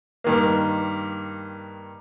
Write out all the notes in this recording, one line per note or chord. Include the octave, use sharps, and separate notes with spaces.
G2 D#3 A#3